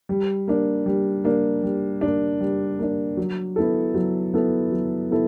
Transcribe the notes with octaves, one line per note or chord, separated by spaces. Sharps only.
G3
A#3 D4
G3
A#3 D4
G3
A#3 D4
G3
A#3 D4
F#3
B3 E4 A4
F#3
B3 E4 A4
F#3
B3 E4 A4